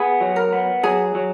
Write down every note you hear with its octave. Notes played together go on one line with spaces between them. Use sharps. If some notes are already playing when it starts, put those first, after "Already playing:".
Already playing: B3 G#4
F#3
A#4
B3
F#3 G#4
F#3